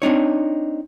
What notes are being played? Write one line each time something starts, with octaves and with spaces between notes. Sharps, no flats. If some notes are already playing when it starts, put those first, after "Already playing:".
C4 D4 D#4 C#5